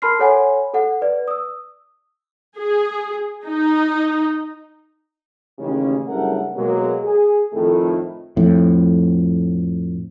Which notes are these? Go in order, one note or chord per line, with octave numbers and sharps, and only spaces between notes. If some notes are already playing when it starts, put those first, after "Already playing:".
A#4 A5 B5 C6 F6 C7
A4 C#5 F#5 G#5 B5 C6
A4 F#5
B4 D5
D#6 E6
G#4
D#4
A1 D#2 C#3
F#1 G2 C#3 A3 A#4 F#5
B2 F#3 G#3 A#3
G#4
F2 A2 D#3 A3
F2 A2